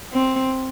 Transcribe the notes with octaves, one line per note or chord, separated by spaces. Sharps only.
C4